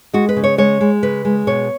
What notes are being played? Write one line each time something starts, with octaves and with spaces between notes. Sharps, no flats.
G#3 F#4
B4
C#3
C#5
G#3 C#5
G#3
C#3 B4
G#3
B2 C#5